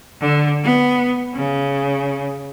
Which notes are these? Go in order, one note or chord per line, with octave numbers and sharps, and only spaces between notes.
D3
B3
C#3